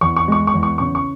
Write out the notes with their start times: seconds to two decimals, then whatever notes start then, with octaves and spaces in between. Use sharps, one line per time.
0.01 E2 C#6
0.16 C#6
0.28 G#3 C#6
0.47 C#6
0.54 E2
0.63 C#6
0.78 C#3 C#6
0.95 C#6